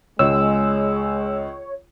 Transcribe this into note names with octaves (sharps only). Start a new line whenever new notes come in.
C#2 G#3 C#5 E6